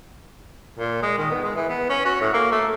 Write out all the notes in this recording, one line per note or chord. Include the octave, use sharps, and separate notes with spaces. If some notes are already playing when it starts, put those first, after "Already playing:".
A#2
G#3
D#3
B3
G#3
E3
B3
C#4
F#4
A2
A#3
A3